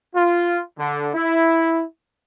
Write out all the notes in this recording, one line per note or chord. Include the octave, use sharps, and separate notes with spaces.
F4
D3
E4